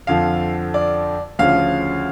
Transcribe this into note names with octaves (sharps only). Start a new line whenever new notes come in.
F2 D3 F3 F5
D5
D2 C#3 F3 F5